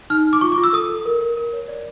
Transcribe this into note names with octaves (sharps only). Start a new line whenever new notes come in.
D#4 F6
D#4
D6
F4 C#6
D6
F4
E6
A4 D#6
A4
A#4
A#4
A#4
C#5
D5